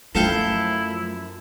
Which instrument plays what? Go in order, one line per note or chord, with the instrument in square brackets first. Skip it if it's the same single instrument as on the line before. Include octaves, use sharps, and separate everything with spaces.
[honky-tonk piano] F#2 F3 [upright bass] A3 [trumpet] E4 [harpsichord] A4 F5 G5